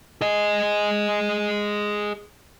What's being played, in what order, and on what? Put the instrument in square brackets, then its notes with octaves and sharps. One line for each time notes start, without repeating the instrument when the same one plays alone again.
[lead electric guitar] G#4 D#5